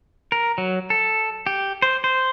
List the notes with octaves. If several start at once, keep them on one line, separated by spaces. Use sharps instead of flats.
A#4
F#3
A4
G4
C5
C5